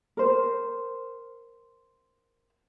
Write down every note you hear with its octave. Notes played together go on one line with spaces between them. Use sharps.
A#4 C5